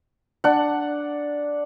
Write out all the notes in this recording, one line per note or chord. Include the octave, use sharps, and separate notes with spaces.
D4 F#5